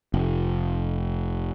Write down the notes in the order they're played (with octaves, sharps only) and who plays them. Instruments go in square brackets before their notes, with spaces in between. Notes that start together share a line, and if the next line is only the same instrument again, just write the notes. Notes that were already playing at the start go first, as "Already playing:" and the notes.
[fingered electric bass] F1